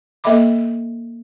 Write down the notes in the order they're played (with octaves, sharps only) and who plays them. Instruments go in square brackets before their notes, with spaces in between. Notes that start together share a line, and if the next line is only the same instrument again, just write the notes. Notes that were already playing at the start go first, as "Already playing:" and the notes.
[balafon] A#3 A4 D#5 E5 B5 D6